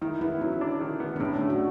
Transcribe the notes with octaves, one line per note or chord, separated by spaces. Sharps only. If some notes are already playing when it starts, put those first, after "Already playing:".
D#3 E4
B3 E4
F#3 C#4
D4
D#3
B3
D4
A2 C#4
D4
A3
F#4